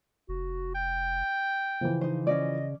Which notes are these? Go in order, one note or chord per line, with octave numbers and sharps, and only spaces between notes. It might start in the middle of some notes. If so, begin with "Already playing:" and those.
F1 F#4
G5
C#3 E3 F3
D#4 C5
C#4 D#4 D5 D#5